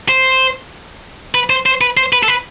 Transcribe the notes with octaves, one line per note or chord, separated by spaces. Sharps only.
C5
B4
C5
C5
B4
C5
B4
A4
B4